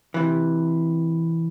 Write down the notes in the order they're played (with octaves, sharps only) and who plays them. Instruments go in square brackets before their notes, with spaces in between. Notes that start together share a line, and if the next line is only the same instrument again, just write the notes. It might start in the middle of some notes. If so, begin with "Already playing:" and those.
[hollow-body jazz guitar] C3 E3